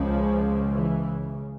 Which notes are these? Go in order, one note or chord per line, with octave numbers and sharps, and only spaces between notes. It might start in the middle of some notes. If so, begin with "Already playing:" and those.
Already playing: C#2 C#3 F3
E3